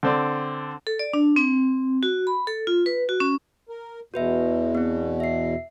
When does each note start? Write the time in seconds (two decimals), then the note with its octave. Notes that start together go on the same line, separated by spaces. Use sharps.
0.03 D3 C4 D5
0.87 A4
0.99 D5
1.13 D4
1.36 C4
2.03 F#4
2.27 B5
2.47 A4
2.67 F4
2.86 B4
3.09 F#4
3.20 C#4
3.69 A#4
4.14 E2 B2 F#4 B4 E5
4.75 B3 C4
5.20 E5 C7